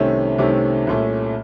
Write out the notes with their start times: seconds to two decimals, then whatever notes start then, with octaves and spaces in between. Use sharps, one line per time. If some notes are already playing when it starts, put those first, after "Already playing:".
Already playing: C2 C3 D#3 A3 C#4
0.38 C2 C3 D#3 A3 C#4
0.87 C2 A#2 A3 C#4